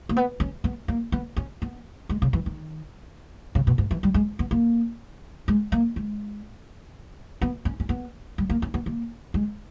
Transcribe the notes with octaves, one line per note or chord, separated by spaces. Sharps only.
A#3
B3
C#4
B3
A#3
B3
C#4
B3
G#3
C#3
E3
D#3
C#3
B2
G#2
E3
G3
G#3
B3
A#3
G#3
A#3
G#3
B3
C#4
C#4
B3
G3
A#3
C#4
B3
A#3
G#3